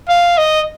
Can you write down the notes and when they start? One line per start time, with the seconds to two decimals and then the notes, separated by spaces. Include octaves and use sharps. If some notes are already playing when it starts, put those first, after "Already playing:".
0.09 F5
0.38 D#5